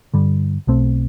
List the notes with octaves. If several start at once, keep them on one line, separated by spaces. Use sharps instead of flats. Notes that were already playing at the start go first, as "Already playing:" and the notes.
G2 D3 G3
B1 B2 A3 C4